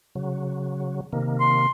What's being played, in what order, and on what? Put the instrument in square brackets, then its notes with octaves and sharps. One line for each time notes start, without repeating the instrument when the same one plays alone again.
[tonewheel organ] C#3 F#3
C3 D#3 A#3
[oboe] C6